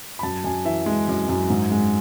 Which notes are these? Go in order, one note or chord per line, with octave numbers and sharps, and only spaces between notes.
B5
F#2 A5
F#2 G#5
E3 E5
G#3
F#2
F#2
G#2
G#3